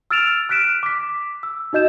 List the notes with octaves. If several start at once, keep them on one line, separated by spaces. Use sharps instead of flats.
E6 F6 A6 D7 E7 F7
F6 F#6 B6 D7 E7
D6 B6
E6
D#4 F#4 D#5 G6 E7